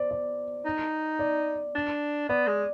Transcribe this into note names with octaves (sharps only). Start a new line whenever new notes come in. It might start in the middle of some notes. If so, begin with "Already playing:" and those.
Already playing: C5 D5
D5
D#4
D5
D4
B3 D5
G#3